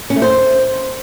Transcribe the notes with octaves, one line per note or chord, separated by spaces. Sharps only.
C#4
A3
C5